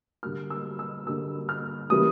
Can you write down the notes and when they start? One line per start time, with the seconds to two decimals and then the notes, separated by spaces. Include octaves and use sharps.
0.23 D3 G3 A#3 F6
0.50 E6
0.79 E6
1.07 D3 G3 A#3 E6
1.49 F6
1.90 C#3 E3 G3 A#3 D#6